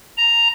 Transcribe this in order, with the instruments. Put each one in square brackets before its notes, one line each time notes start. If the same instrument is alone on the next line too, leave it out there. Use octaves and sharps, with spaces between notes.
[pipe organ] A#5